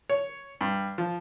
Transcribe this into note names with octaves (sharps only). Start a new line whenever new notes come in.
C#5
G2
F3